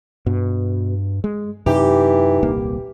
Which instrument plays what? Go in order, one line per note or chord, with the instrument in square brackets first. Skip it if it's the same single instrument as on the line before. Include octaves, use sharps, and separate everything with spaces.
[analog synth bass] G2 [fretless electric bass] B2
[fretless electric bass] G#3
[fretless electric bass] F#2 C3 [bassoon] E3 [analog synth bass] D#4 [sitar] G4
[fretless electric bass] D#1 C2 A#3